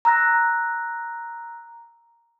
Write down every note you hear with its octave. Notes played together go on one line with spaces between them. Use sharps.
A#5 E6 F#6 A#6